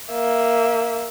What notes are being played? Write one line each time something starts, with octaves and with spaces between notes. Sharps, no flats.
A#3 E5